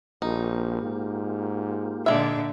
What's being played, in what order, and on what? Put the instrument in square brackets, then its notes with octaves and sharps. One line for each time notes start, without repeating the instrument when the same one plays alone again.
[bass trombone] A#1 [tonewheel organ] A#3 F4 G4 [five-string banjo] D#4
[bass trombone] G#2
[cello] A#2 D3 [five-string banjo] G#3 E5